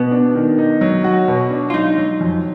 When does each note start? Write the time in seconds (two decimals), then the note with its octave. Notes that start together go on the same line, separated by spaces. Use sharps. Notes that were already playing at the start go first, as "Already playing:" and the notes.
Already playing: B2 B3
0.11 D4
0.35 D#3
0.58 D#4
0.81 F#3
1.04 F#4
1.28 B2
1.50 D4
1.70 F4
1.74 F#3 D#4
1.98 F#3
2.20 F2